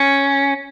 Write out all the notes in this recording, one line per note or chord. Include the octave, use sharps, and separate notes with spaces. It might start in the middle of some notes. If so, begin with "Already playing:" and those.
Already playing: C#4